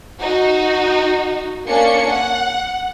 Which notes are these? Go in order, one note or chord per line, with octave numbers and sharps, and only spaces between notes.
D#4 F#4
A#3 C#4 D4 C#7
F#5